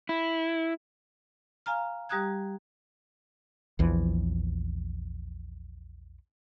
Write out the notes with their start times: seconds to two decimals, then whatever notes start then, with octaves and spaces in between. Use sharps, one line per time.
0.09 E4
1.66 F5 G#5 A#5 F6
2.09 G3 G4 A#5 D#6 F#6 G#6
3.79 A#1 E2 E3 F3